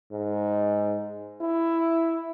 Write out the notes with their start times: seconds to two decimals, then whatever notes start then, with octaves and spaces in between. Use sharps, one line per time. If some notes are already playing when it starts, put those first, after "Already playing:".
0.11 G#2
1.41 E4